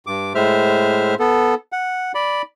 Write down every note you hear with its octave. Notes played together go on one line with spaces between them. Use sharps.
G2 D6
A2 G#3 C5 E5 F6
B3 A4
F#5
D5 B5